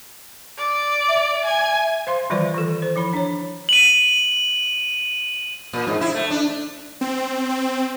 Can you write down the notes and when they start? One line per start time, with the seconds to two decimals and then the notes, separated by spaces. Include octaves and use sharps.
0.58 D5
1.08 E5
1.45 G#5
2.07 C5 F5 C6
2.30 D#3 E3 G3 F4 C5 D5
2.54 E3 A4
2.82 C5
2.96 F3 E4 B5
3.13 D4 C#5
3.69 D#7 F#7
5.73 A#2
5.87 G#2
6.01 E4
6.15 A3
6.31 D4
7.01 C4
7.49 C4